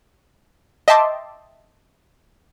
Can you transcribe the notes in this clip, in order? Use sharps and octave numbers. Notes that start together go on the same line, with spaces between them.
D#5 E5 G5 A5 C6 D6